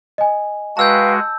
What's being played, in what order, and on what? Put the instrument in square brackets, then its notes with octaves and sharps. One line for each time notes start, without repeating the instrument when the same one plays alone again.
[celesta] D#5 G#5
[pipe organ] G#3 F#4 [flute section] B4 F5 G5 [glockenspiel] A5 E6 G6